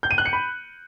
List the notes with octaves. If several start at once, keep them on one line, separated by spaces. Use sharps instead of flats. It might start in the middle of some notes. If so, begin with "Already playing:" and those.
G6
D#7
F#6
C#7
B5